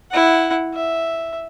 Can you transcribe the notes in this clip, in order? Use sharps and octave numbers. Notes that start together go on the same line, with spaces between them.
E4 F#5
E5